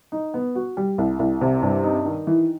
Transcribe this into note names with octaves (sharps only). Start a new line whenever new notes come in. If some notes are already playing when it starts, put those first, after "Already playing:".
D#4
B3
F#4
G3
C2
C2
C3
G2
D#4
D#3
E3